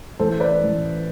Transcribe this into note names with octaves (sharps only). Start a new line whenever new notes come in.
A1 A2 E3 A4 C5
B4 D5
A1 A2 E3